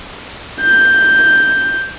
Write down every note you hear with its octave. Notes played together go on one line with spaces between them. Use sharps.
G6